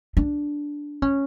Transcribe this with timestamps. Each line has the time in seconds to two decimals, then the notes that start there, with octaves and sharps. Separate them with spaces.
0.17 D4
1.02 C#4